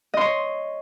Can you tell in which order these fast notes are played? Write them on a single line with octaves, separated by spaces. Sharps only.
D#5 C6 C#5